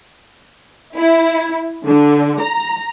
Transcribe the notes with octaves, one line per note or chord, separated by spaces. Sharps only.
E4
D3
A#5